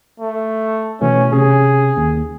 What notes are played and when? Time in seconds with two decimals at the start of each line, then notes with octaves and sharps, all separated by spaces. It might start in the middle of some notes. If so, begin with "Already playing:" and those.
0.20 A3
1.01 B2 E3 A3 C#4
1.32 C3 C#4 G#4
1.97 D#2